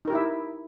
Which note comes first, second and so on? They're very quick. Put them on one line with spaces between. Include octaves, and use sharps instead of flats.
D#4 A#4 G4 E4 E5